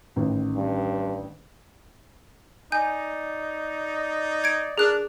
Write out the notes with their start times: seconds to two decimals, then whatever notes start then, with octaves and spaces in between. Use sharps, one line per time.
0.16 A1 D#3
0.56 G2
2.72 D#4 D5 G#5 G6
4.44 G#6 D7
4.78 D4 G#4 A#4 F#6